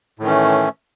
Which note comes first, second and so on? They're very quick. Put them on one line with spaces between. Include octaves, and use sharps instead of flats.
A2 D#3 E3 C#4 A3